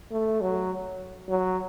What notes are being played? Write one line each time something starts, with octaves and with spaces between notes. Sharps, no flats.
A3
F#3
F#3